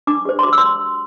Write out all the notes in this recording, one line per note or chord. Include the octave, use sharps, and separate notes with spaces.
D4 D6
G4 C5
C6
F#4 D6
E6
C6